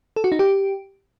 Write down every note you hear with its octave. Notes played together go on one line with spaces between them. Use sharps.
A4
F#4
D#4
G4